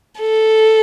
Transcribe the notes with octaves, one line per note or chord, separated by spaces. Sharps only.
A4